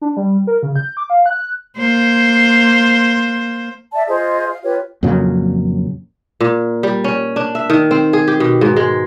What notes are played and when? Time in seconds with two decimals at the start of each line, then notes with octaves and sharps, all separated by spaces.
0.02 D4
0.17 G3
0.47 A#4
0.63 C#3
0.76 G6
0.97 D6
1.10 F5
1.26 F#6
1.78 A#3 C5
3.92 D5 E5 A5
4.08 F4 G#4 C5 D#5
4.48 F5
4.63 F4 G4 B4 C#5
5.03 F2 A#2 C#3 F#3
6.41 A#2
6.83 G3
7.04 C#4
7.36 D4
7.55 E5
7.70 D#3
7.91 C4
8.13 G#4
8.28 G4
8.40 B2
8.61 G#2
8.77 G#3